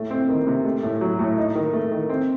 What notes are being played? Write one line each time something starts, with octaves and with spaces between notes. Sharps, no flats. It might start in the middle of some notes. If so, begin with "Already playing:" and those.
Already playing: A2 A3
C4
D#3
C3
A3
A2
F#3
A2
D#4
D#3
A3
D#3
C4